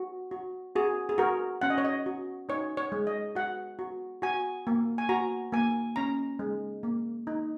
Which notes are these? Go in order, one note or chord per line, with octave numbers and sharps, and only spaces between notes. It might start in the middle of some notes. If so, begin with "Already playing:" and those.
Already playing: F#4
F#4
F#4 G#4
G#4
F#4 A#4
C#4 F#5
D#5
C#5
D#5
F#4
D#4 C#5
C#5
G#3
D#5
F#4 F#5
F#4
F#4 G#5
A#3
G#5
F#4 A#5
A#3 G#5
C#4 A#5
G#3
A#3
D#4